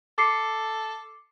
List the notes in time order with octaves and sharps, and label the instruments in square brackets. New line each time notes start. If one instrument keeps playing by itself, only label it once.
[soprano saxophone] A4 [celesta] D6 C7 C#7